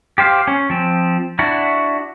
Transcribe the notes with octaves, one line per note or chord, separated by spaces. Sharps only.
G4 C5 F5
C#4
F3 C4
D4 E4 F#4